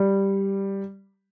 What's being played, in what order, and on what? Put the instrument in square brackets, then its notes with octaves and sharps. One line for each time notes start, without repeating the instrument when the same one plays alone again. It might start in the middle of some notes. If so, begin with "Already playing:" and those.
Already playing: [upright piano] G3